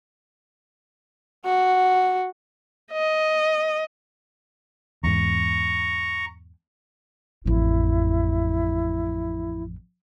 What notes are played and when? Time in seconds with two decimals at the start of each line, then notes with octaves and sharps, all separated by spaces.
1.45 F#4
2.92 D#5
5.04 E2 G#2 A#5 C#6
7.46 A1 F2 E4